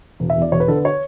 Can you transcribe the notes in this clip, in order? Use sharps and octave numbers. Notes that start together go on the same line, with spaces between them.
E1
E5
E2
D5
E1 C#5
B4
D3 A4
B4
C#5